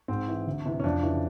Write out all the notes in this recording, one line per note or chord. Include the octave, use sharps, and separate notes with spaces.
G#2 C4
E3
D2
C3 E3
C#4
F2 D4
C#3 E3